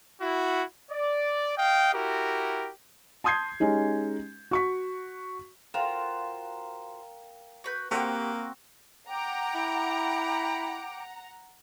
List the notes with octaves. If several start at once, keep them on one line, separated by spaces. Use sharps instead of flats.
E4 F#4
D5
D#5 F5 G5
E4 F#4 G4 A#4
A5 C6 D#6 G6 G#6 C7
G#3 C#4 D#4 G4
F#4 C#6 B6
F4 F#4 A#4 C5 F5 G5 E7
F#4 B4 G6
A#3 C4 F#4 G4 F#5 G5
F#5 G5 A#5 D6
E4